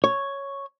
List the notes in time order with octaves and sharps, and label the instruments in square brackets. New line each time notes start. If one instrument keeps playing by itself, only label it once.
[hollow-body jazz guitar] C#5